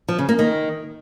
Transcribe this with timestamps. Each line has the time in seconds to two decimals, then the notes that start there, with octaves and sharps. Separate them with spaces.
0.09 F3
0.19 C#3
0.29 A#3
0.39 D#3